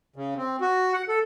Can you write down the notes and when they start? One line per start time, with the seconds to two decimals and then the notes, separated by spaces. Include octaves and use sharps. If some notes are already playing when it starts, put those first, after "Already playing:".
0.16 C#3
0.37 C4
0.61 F#4
0.93 F#5
1.08 A4